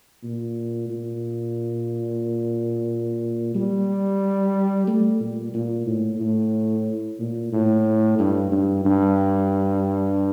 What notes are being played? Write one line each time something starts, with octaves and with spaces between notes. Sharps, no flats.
A#2
A#2
G3
A3
A#2
A#2
A2
A2
A#2
A2
G2
G2
G2